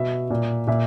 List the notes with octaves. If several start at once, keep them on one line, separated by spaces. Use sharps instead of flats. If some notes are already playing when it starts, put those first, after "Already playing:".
Already playing: B2 E5
A#2
A#2 E5